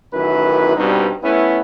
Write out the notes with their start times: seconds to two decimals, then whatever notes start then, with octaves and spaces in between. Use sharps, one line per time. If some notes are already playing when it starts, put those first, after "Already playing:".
0.14 A1 F#2 D#3 E4 B4
0.76 G2 B2 G3 C4 D#4
1.24 A3 B3 C#4 E4